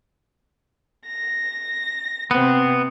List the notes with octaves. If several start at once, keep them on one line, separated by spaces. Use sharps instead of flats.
A#6
C3 B3 C4